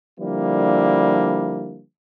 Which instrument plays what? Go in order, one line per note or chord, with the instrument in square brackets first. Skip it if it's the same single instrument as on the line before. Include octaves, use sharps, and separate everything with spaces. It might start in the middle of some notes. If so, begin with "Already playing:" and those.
[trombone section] D3 F3 G3 A#3 D4 E4